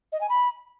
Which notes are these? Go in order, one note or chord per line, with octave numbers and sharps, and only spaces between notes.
D#5
G#5
B5